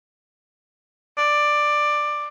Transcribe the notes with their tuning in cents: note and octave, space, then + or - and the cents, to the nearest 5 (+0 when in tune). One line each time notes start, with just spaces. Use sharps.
D5 +10